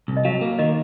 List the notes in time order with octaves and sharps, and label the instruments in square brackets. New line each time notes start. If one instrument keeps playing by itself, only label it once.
[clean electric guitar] C2
[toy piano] D#5
[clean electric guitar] F#3 [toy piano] F5
[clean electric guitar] A#3
[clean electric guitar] D#3 [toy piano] D#5